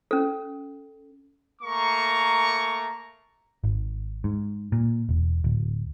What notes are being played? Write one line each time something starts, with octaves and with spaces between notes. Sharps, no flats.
C#4 A4
A3 A#3 A#5 C#6
G#1
G#2
A#2
E1
D1